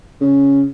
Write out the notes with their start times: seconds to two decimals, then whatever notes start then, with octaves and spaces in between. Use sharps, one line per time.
0.21 C#3